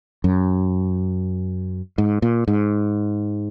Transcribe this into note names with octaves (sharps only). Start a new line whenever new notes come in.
F#2
G#2
A#2
G#2